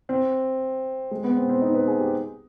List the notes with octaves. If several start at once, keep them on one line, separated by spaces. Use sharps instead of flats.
C4
G#3
B3
C4
C4
D#4
B4
G#4
G4